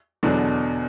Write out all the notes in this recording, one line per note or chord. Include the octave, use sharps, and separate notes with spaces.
E2 B2 D3 F#3 D4